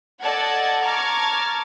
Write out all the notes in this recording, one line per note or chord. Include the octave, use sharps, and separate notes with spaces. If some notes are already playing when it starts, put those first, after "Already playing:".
A4 D5 D#5 F#5 A5 G#6
A5 A#5 C#6 D6 F6 G#6